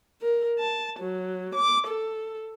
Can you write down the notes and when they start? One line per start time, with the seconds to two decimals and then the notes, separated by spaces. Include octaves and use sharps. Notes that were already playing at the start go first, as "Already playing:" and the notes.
0.21 A#4
0.59 A5
0.99 F#3
1.55 D6
1.87 A4